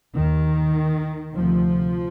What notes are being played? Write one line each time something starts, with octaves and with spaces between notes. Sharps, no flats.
D#2 D#3
D2 C3 F3